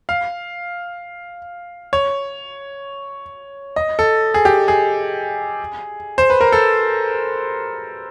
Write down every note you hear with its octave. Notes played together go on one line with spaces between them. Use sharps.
F5
C#5
D#5
A4
G#4
G4
G#4
C5
B4
A#4
A4